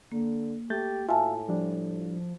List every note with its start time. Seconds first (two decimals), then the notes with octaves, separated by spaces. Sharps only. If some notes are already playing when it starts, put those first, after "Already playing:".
0.12 D3 A#3
0.70 A3 G4 G6 A6
1.09 A2 F4 F#4 E5 G#5 A5
1.49 F3 G3 D4